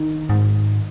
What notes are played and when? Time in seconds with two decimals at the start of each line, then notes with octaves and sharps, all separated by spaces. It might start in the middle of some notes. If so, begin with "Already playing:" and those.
Already playing: D#3
0.29 G#2